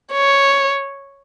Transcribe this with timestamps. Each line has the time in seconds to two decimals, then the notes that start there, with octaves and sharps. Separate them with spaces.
0.13 C#5